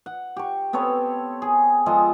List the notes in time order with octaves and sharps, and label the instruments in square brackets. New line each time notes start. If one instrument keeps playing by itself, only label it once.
[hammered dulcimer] F#5
G4 C#6
B3 C4 A4 C#5
G#4
F3 G#3 A4 D#5